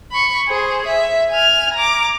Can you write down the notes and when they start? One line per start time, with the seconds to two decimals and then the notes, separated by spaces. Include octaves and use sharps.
0.12 B5 C#6
0.48 G#4 C5
0.87 E5
1.31 G#5 F6
1.74 A#5 D6